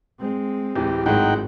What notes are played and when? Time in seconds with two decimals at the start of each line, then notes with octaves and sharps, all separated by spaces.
0.19 G#3 C4
0.76 D1 E3 G4
1.06 G#1 A2 F#3 G#3 D#4 F#5 G5